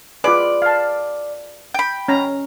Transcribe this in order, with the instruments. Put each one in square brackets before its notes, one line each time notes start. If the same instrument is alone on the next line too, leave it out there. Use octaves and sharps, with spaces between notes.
[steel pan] F4 G#4 B4 [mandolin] D5
[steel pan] F5 A5
[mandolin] G5 B5
[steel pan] C#4 A#5